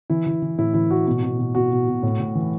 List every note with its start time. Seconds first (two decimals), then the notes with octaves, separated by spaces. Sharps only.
0.10 E3 E4
0.26 E3
0.42 E3
0.58 A2 E4
0.74 E3 E4
0.91 A2 F#4
1.07 B2 F#4
1.23 B2
1.38 B2
1.55 B2 F#4
1.71 B2
1.87 B2
2.03 A2
2.20 A2
2.35 E3